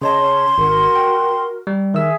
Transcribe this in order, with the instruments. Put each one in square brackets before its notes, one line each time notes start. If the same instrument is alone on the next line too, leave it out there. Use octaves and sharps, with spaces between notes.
[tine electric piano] C#3 C#5 A5 [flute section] D#5 [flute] C6
[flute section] C#4
[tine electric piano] G#1 [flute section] F#4 A#4
[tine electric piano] G5
G3
[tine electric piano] D#3 E6 [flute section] G#4 E5